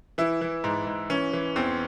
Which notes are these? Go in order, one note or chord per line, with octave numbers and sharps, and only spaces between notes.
E3 E4
E3
G#2
G#2
E3 C#4
E3
E2 C4